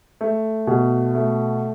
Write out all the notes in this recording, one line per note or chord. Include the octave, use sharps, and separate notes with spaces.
A3
B2
A3